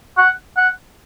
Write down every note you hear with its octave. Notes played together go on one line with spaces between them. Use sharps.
F#5
F#5